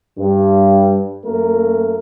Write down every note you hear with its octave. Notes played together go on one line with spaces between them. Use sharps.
G2
F#2 A3 A#3 A#4